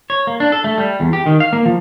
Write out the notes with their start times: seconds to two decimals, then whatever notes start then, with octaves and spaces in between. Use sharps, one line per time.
0.10 C#5
0.27 A#3
0.40 D4
0.52 A4
0.64 A3
0.78 G3
1.00 E2
1.13 G4
1.26 D#3
1.40 F5
1.53 A#3
1.66 F3